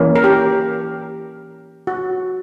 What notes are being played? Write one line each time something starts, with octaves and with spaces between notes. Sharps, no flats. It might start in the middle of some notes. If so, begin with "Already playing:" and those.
Already playing: E3 A#3 C#4
A#4
G4
F#4